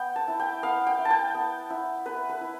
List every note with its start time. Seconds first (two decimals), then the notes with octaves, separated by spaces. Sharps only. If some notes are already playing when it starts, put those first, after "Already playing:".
Already playing: B3 G5
0.16 A5
0.28 E4
0.40 G5
0.63 B3 F5
0.87 G5
0.99 E4
1.05 A5
1.10 G5
1.35 B3
1.70 E4
2.06 B3 B4
2.29 B4
2.41 E4